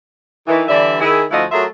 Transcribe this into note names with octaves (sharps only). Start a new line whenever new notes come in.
D#3 E3
D3 E3 G3 D4 D5 E5
D#3 E4 G#4
D2 F3 E4 F#4 D#5 F5
F#3 A3 F4 G#4 A#4 E5